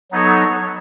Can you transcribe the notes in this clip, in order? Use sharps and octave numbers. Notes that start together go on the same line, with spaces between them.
F#3 B3 D#4 A4 C#5